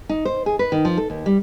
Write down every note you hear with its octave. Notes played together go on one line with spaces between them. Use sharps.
D#4
C5
G#4
B4
D#3
F3
A4
D#2
G3